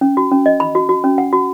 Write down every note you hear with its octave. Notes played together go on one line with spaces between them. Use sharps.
C#4
F#4
C#4
D#5
B5
F#4
F#4
C#4
F#5
F#4